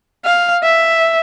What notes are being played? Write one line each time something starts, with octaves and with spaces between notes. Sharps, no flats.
F5
E5